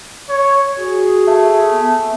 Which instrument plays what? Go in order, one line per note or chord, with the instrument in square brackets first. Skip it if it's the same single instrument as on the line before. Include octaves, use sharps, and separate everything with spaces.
[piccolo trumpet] C#5
[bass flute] F#4 [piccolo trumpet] G#4
[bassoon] A3
[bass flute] B3